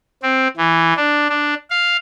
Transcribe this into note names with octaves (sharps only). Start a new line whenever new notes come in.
C4
E3
D4
D4
F5